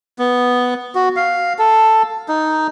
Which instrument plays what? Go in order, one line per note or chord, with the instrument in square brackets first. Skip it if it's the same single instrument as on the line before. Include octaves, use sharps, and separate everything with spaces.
[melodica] B3
F#4
F5
A4
D#4